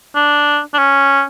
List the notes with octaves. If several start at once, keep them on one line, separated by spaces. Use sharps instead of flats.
D4
D4
C#4